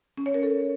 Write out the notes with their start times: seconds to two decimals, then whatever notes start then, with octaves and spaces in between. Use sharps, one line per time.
0.18 C#4
0.26 C#5
0.34 A#4
0.43 A4